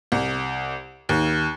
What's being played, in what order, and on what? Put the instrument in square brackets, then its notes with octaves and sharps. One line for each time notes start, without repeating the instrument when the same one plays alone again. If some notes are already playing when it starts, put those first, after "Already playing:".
[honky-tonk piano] C2
D#2